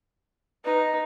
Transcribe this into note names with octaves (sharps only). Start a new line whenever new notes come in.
D#4 B4